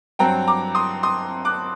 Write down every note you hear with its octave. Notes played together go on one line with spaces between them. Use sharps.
G2 F#3 C4 G5 A#5
A#5 D6
C6 D#6
C6 D#6
D6 F#6